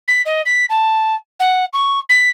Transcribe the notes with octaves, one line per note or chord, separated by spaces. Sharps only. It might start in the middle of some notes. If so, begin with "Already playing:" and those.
B6
D#5
B6
A5
F#5
C#6
B6